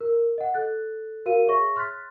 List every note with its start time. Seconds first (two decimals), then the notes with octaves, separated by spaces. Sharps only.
0.01 A#4
0.38 D#5 F#5
0.54 A4 F#6 A6
1.26 F#4 A#4 F5 D#7
1.47 G#4 C#5 E5 C#6 A#6
1.76 C6 F6 F#6 A6 B6